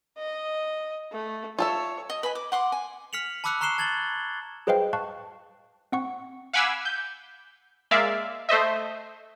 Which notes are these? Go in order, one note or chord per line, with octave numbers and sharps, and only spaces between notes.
D#5
A3
F4 A4 C#5 E5
D#5
B4 G#5 B5
D6
F#5 C6 D6
G#5
F6 B6 C#7 F7 F#7
A5 B5 D6 E6 F#6 C#7
A#5 C#6 F#6 C7 E7 G7
A5 G#6 A6 F#7 G7
G#4 B4 C5 D#5 F5 G5
F5 A5 C#6 F#6
C4 F#5 C#6
F5 F#5 G#5 B5 D6 E6
G6
G#3 A#3 D5 E5 F5
A3 C5 D#5 E5